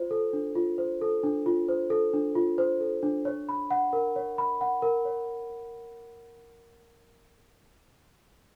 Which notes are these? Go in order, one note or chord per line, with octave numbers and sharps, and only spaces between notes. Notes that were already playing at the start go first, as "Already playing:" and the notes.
Already playing: F4 C5
A4
D4
F4
C5
A4
D4
F4
C5
A4
D4
F4
C5
A4
D4
C#5
B5
F#5
A#4
C#5
B5
F#5
A#4
C#5